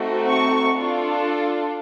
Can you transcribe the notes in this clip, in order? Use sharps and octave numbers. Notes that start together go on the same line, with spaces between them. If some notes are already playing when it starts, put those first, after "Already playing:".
Already playing: A3 C4 D#4 F#4 A4
C#6
D4 F4 A4